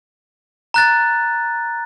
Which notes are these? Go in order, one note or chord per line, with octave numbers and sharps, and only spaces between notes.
A#5 F#6 A6